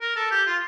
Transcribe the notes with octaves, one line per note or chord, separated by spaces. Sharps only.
A#4
A4
G4
F4